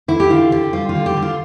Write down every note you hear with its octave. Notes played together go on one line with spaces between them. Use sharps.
D3 E4
G4
D3 F4
D3 G4
G3 F4
F4
D3
G4
D3
F4